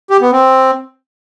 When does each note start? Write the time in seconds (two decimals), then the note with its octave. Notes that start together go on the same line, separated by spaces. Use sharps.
0.11 G4
0.21 B3
0.32 C4